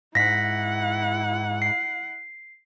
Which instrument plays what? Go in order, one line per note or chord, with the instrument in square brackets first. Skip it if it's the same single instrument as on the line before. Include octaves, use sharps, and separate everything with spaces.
[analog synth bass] G#2 [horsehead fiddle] E4 F#5 [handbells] A#6 B6
[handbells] C7